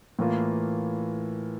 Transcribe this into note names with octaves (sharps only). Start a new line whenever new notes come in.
A2 E3 A#3 F4